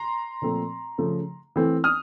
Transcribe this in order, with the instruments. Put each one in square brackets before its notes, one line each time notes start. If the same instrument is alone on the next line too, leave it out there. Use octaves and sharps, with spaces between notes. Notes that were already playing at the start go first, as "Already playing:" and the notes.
Already playing: [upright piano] A#5 C6
A#2 F3 A3 C4
C#3 F3 A3
E3 A3 C4
D#6 F6